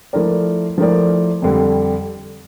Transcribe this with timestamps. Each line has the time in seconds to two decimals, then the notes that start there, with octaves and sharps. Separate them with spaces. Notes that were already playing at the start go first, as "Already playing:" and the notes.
0.13 F3 A3 E4 A#4 D5
0.78 F3 A3 E4 A#4 D5
1.42 F2 D3 G3